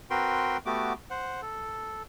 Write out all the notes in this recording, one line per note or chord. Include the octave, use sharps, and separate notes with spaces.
C4 F#4 A#4 B4 G5 C6
A3 B3 F#4 G4 D6
C5 F#5
A4